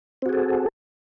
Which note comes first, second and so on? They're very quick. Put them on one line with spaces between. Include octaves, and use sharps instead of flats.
C4 F#4 G#4 A4